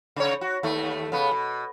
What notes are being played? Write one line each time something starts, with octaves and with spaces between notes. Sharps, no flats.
C#3 C#5
F#4
D#2 A3
C#3 B3
B2